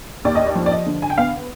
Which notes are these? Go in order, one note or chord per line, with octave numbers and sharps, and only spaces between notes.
D#2 D5
D#5
D5
F3
D5
D#5
D3
G#5
G5
B3 F5